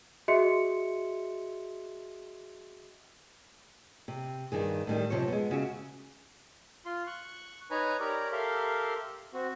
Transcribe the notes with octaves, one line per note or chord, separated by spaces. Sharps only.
F#4 G#4 D#5 E5 C6 C#7
C3
G2 D#3 G#4
A2 D#3 G3
F#2 C3 F3 C#5
G#3 B3
C#3 F#4 E5
F4 C6
C#6 F#6
D#4 B4 C#5 G#5 A#5
G4 A#4 C#5 D5 A#5
G4 A4 A#4 E5 F5 C6
C4 F#4